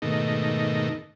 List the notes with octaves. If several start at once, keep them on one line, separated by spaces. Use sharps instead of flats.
G#2 B2 D#3 A3 A#3 D#4